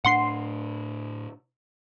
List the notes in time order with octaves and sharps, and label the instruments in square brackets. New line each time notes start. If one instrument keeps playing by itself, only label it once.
[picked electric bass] A2 D4 [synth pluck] F#5 C6 C7